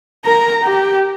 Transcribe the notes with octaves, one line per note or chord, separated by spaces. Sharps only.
A#4 A#5
G4